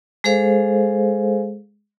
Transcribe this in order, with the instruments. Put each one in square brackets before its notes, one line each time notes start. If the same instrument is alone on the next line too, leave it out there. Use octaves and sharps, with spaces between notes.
[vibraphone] G#3 G#4 A4 C5 F5